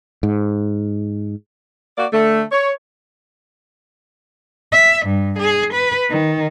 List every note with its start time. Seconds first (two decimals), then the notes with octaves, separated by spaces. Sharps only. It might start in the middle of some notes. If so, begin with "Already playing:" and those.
0.23 G#2
1.97 A#3 F#4 D5
2.12 D3 A3
2.52 C#5
4.72 E5
5.06 G2
5.39 G#4
5.74 B4
6.10 D#3